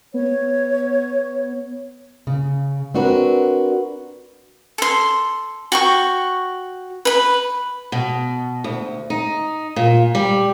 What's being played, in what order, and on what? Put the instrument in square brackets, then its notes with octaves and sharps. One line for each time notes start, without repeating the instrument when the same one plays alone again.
[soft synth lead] B3 [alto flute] C#5
[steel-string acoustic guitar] C#3
C4 D4 F#4 A#4 B4
[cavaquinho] A4 C6
F#4 G5 C#6
B4 B5
[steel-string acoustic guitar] B2
D2
D#4
A#2
G3